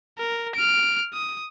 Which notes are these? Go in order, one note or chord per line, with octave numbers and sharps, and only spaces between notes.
A#4
F6 D7
D#6